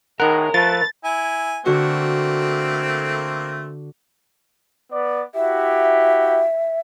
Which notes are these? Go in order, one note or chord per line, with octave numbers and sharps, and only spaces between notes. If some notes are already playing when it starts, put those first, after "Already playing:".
A2 D#3 G#3 A#4 F#5
F3 A3 B4 A6
E4 G#5
D3 A3 A#3 C4 F#4
B3 D5
E4 F#4 G4 E5